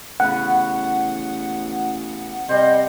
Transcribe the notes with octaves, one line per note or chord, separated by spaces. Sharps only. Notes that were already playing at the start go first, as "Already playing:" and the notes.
A1 C#3 B3 F#5
C3 G3 C5 D#5